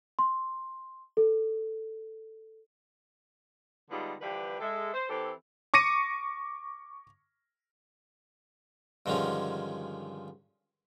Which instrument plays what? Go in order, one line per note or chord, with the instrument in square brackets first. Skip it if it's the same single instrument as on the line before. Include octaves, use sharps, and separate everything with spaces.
[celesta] C6
A4
[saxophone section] D3 G3 G#3 B3 D#4 F4
D3 E3 F3 G3 G4 B4
G#3 A4 E5
C5
E3 C4 G4 A4
[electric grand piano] C#6 D6 A#6 C#7 D#7
[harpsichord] G2 D3 D#3 F3 G#3 C#4